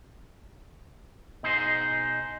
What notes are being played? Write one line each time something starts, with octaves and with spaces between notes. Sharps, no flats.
B2 D#4 G#4 C5